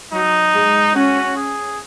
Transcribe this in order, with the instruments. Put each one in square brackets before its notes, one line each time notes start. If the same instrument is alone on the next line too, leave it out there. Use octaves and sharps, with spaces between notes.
[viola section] F#3 [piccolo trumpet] D#4
[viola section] G#3
[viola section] C#4 [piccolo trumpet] F#4
[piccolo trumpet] G#4